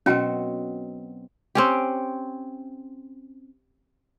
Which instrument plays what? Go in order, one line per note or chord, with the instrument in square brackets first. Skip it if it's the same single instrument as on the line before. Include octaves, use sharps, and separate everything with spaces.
[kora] B2 F#3 C4 [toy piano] C#4 G5
[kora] C4 C#4 G4